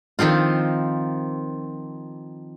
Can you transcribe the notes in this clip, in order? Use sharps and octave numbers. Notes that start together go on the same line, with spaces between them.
D#3 F3 C4 F4